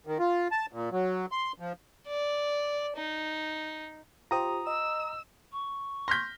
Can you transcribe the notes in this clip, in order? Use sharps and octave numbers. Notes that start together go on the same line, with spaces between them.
D#3
F4
A5
A#2
F#3
C6
F3
D5
D#4
F4 G4 C5 A#5 D#6
D#5 E6
C#6
C6 F6 G6 A#6 B6